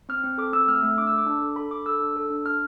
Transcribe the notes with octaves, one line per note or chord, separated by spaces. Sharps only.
C4 F6
C4
A4 D6
C4 E6
A3 F6
A3 E6
D4 D6
E6
A4
D6
D4
A4
A4 B5
D4 D6
A4 E6
D4
A4
D4
D4 F6